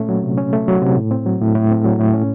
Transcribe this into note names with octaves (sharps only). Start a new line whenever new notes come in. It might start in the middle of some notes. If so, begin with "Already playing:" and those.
Already playing: A#2 A3 C#4
F#3
C3
C#4
A3
F#3
C3
A2
C4
F#3
A2
A2
C4
F#3
A2
C#4